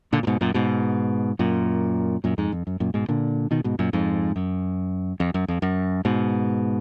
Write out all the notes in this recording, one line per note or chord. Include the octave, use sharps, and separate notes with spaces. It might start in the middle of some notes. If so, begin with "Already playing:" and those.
A#2 D3
A#2
G#2 B2
F#2 A#2
G#2 B2
F#2 A#2
F#2 A#2
F2 G#2
F2
F#2
F#2 A#2
G#2 B2
A#2 D3
B2 D#3
G#2 B2
F#2 A#2
F2 G#2
F#2
F2
F#2
F2
F#2
G#2 B2